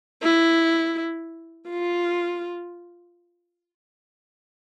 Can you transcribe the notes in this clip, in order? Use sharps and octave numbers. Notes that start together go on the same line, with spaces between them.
E4
F4